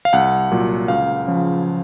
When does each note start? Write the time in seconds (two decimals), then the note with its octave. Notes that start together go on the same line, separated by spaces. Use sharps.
0.05 F5
0.13 C2 F#5
0.51 A#2 F#3
0.88 C#2 F5
1.27 C#3 F3